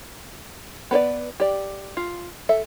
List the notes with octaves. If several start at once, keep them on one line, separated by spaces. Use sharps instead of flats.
B3 B4 C5 D5
G4 D5
F4
A4 E5